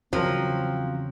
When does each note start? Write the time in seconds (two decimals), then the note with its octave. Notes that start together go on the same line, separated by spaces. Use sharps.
0.13 E2 C#3 F3 F#3 C4 A#4